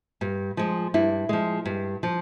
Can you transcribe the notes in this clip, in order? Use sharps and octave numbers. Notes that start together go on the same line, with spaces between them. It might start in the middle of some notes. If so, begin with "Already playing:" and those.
G2
F3 G#3
G2 E4
F3 G#3
G2
F3